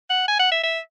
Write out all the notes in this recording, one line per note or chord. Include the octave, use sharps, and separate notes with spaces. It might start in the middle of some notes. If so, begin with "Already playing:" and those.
F#5
G#5
F#5
E5
E5